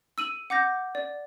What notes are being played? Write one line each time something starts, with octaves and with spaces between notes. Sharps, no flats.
E6 D#7 F#7
F#5 D6 G6 A#6
D5